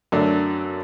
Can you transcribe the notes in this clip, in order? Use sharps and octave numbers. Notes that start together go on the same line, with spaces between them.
F#2 D3 A3 D4